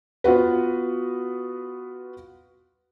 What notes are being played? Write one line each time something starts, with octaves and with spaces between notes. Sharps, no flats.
B3 F4 F#4 B4